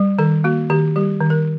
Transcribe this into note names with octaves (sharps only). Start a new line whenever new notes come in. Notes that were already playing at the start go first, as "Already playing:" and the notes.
Already playing: G3
D#3 A4
A#3 F#4
D#3 G4
G3 G4
D#3
A#4